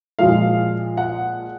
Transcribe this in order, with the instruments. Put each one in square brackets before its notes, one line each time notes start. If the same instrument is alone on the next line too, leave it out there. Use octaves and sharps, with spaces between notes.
[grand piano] A#2 F3 G#3 F5
F#5